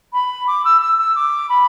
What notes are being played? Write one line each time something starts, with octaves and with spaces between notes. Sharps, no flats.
B5
D6
E6
E6
E6
D6
B5